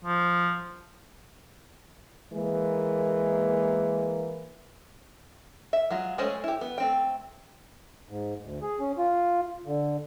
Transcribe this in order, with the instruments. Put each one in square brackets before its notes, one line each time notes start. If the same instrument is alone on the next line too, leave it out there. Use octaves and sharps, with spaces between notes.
[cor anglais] F3
[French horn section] E3 G#3 A#3
[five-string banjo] E5
F#3 G#3 F4
G#3 A3 C#4 C5
E4 G4
B3
A3 C4 G5
[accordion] G#2
D2
G#4
C#4
F4
D3